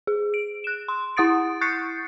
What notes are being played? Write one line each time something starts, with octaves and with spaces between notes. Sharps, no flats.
G#4
D7
F#6 E7
C6
E4 F#5 D#6 A6 D7
C#6 F#6 G6 A6 C7 C#7